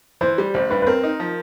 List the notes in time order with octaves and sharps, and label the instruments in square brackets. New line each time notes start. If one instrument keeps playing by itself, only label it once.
[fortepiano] E3 [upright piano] C5
[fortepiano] G3
[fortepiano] A1 [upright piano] C5
[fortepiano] G2 [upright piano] B4
[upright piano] B4
[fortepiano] C4 [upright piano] A#4
[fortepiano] D#4
F3